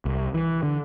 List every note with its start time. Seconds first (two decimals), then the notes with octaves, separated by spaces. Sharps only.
0.05 C2
0.34 E3
0.63 D3